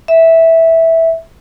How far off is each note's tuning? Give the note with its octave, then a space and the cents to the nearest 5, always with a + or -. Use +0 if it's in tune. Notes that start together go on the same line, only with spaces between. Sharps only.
E5 -10